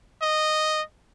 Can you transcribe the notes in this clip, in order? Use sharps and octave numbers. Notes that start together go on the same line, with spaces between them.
D#5